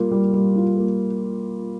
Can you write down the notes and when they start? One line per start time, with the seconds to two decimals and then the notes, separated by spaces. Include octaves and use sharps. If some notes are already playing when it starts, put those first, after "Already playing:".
Already playing: G3 A#3 F4
0.11 G3
0.34 G3
0.56 F4
0.77 A#3